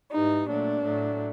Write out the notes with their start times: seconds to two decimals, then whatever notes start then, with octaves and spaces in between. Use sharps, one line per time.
0.12 G#2 E3 G3 D#4
0.47 A#2 F#3 A3 D4
0.84 A2 F#3 A3